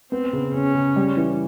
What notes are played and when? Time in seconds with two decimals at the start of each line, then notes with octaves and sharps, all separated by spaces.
0.12 B3 C4
0.33 C#3
0.54 C#3 C#4
0.75 C#3
0.96 G3
1.17 E3